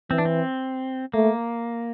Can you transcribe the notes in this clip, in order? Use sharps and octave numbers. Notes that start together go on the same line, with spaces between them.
E3 C4
D4
C4
A3 A#3